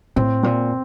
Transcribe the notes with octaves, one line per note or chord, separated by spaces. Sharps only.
A2 C4
A#2 C4